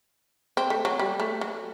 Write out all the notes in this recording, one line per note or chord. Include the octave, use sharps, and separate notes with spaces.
C4
A3
F#3
G3
A3
F#3